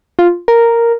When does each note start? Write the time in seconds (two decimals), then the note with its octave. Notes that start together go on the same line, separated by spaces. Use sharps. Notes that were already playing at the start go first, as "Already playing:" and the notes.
0.19 F4
0.48 A#4